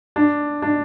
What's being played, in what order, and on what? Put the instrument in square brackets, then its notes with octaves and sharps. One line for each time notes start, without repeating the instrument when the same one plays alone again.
[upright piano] D4
D4